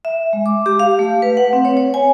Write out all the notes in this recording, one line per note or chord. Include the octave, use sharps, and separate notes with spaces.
E5
G#3
D6
G4
F5
A3
B4
F#5
C4
C#5
C#5
G#5